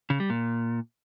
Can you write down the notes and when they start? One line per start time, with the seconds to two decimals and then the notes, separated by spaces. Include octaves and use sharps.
0.10 C#3
0.20 G3
0.30 A#2